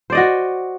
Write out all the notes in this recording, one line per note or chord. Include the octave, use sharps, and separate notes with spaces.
F#4 C5 D5 D#5